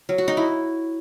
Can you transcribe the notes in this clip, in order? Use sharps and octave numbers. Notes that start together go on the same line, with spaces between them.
F#3
F#4
D#4
E4